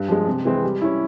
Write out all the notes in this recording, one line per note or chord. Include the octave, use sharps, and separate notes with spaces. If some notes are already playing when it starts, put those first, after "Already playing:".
Already playing: G2
F3 G#3
C3
E3 G#3 C4
G3
C#4 E4